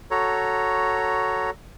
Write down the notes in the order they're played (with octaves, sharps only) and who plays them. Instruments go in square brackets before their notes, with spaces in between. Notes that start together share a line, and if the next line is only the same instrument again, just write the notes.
[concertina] F#4 A4 C#5 A#5